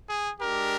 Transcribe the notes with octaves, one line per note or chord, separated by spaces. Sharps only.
G#4
G#3 D4 G4 A#4